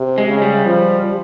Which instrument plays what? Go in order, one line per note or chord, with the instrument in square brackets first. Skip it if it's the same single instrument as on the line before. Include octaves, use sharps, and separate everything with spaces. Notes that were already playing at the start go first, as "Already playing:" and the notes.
Already playing: [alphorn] C3
[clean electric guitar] G#3
[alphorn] C#3
[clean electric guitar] G3
[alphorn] F3